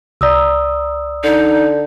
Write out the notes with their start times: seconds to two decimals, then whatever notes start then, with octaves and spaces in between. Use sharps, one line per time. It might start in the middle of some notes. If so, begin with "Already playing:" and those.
0.21 C2 D5 A#5 D#6 E6
1.24 D3 D#4